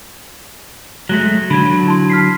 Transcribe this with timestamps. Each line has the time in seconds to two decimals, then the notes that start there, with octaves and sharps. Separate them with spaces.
1.09 F#3 G#3 A3 F#6 A#6
1.50 D3 F#3 B5 G#6
1.86 E4 A5 C6
2.10 F6 B6 C7